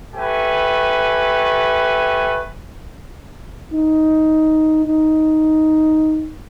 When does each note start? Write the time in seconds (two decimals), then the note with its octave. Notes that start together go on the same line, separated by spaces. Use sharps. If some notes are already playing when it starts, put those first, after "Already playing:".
0.13 A3 G4 B4 G#5
3.73 D#4
4.85 D#4